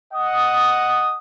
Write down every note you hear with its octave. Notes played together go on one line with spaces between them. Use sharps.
D#5 F#5 D#6